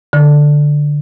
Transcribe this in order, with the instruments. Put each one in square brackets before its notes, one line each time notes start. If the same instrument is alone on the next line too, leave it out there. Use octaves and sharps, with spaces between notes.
[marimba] D3